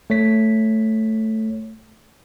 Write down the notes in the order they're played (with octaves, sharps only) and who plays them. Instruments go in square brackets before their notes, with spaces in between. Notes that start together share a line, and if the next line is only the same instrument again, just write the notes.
[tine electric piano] A3 C#5 B6